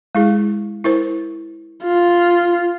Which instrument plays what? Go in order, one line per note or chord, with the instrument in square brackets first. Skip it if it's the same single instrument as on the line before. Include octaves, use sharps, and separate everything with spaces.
[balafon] G#3 E4 G#4
E4 A#4 C5
[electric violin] F4